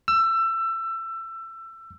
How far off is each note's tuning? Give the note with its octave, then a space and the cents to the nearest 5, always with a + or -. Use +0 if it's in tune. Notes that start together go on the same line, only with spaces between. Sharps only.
E6 +25